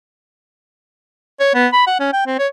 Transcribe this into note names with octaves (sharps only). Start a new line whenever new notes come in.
C#5
B3
B5
F#5
C#4
G5
C4
C#5